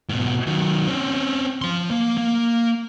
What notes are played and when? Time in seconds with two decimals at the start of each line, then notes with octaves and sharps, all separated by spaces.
0.09 G#2 B2
0.47 D#3 F#3
0.87 C4 C#4
1.62 F3 C6
1.91 A#3
2.17 A#3